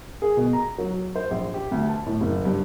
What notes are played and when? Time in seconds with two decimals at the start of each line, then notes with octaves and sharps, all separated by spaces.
0.22 G#4
0.37 B2
0.53 A#5
0.78 F#3
1.16 C5
1.31 A#1
1.54 G4
1.72 D2
1.89 A5
2.06 A2
2.21 F#1
2.45 G2